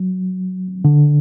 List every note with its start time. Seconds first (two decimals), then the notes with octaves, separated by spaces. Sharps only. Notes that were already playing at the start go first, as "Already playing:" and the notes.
Already playing: F#3
0.85 D3